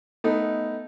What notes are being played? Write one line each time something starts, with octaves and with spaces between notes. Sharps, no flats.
A3 B3 D#4